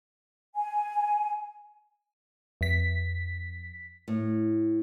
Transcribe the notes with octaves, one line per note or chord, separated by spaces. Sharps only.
G#5
F2 B6
A2